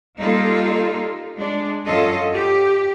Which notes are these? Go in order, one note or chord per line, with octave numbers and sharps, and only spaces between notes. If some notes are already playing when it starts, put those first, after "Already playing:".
G3 A#3 D#4 F4 A4
G#3 D4
F#2 C#4 F4 A4 D#5
G4